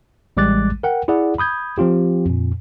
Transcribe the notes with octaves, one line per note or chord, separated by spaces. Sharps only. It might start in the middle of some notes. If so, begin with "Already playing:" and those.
A1 G3 G#3 D6 F#6 A6
A#4 F#5 G5
E4 G#4 D5 F#5
B5 D#6 G6 G#6
F3 C4 F4 G4
F2 A#2